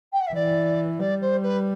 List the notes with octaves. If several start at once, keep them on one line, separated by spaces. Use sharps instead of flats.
G5
F#5
E5
E3 D5
G3 D5
C5
B4